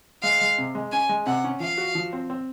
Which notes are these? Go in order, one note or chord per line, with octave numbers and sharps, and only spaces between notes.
G#3 F5
G#3
C3
G#3
C#4 G#5
G#3
C3 F#5
C#4
F3 F5
F#4
F3
C4
C4